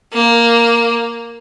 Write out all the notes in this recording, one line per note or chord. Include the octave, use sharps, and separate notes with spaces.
A#3